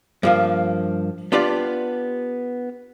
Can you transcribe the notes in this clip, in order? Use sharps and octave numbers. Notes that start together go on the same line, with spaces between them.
G2 F3 A#3
B3 D4 F4 G4 D5